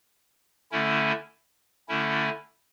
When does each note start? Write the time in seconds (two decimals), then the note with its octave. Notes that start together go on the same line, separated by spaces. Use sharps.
0.71 D3 A3 C#4 E4
1.88 D3 A3 C#4 E4